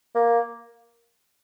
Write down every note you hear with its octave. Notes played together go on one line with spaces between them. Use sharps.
A#3